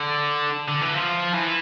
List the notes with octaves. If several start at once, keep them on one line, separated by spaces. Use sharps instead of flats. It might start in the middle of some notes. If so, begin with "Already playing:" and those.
Already playing: D3
D3
E3
F3
E3